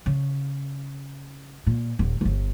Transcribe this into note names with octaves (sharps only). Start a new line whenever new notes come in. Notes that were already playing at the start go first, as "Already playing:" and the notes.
C#3
A#2
D#1
D1 G1